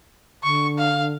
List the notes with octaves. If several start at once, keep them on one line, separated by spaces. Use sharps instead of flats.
D3 C#6
F5